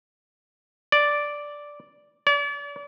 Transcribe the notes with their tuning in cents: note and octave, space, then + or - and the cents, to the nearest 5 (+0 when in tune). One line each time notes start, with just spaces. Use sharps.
D5 -5
D5 -40